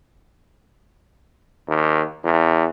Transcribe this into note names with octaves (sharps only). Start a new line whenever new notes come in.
D#2
E2